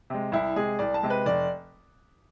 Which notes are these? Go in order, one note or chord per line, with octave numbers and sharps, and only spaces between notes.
C3 G#3
C2 E4
C3 G#3 G#4
C2 D5
A5
C3 G#3
B4
F1 D5